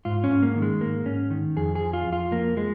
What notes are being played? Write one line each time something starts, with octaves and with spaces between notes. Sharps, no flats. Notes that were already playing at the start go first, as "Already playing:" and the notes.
G#2 F4
C#4
G#2
A#3
D#3
G#3
G#2 A#3
G#2 C#4
D#3
F2 G#4
G#4
F3
F4
F2
F4
F3 A#3
F3 G#3